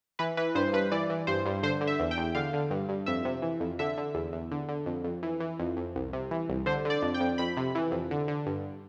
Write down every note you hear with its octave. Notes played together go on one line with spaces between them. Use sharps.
E3 B4
E3 B4
G2 C5
G2 B4
E3 D5
E3
G2 C5
G2
D3 C5
D3
E5
E2
G5
E2
D3 F5
D3
G2
G2
F2 E5
C3
E3
F2
D3 E5
D3
E2
E2
D3
D3
F2
F2
E3
E3
F2
F2
C2
C3
E3
C2
D3 C5
D3 D5
F2
G5
F2
F2 B5
C3
E3
F2
D3
D3
G2